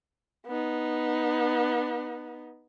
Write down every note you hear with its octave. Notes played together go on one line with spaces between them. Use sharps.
B3 D#4